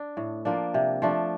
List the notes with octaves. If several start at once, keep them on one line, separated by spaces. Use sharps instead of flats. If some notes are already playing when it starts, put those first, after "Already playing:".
Already playing: D4
A2
F3 A#3 D4
C3
F3 A3 D4